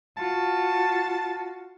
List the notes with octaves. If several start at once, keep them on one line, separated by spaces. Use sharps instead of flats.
F4 F#4 A5